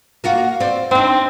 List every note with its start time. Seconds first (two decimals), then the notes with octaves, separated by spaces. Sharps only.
0.24 A#3 F4 F#4
0.60 C4 D5
0.91 C4 D4 D#4